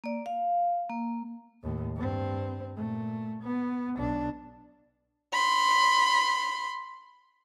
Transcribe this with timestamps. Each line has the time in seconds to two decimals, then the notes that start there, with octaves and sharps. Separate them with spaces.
0.04 A#3 D5
0.26 F5
0.90 A#3
1.63 D#2 A2
1.96 G2 C4
2.76 A#2 A3
3.43 B3
3.96 B1 D4
5.33 B5 C6